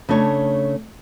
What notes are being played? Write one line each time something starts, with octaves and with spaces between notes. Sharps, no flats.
C#3 A3 D4 C#5